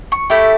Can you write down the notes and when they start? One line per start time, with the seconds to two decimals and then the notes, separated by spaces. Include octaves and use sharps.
0.12 C#6
0.30 A3 E4 G4